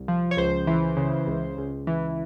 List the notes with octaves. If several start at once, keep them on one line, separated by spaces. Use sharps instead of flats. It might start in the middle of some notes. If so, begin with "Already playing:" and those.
Already playing: C2
F3
C#5
C#2 C5
E3
C#3
C#2
C#2
E3